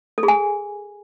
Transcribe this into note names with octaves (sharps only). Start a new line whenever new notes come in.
A4
G#4
G#5